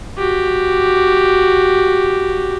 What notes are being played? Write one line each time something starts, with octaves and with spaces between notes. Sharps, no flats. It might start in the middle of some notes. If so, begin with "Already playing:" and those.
F#4 G4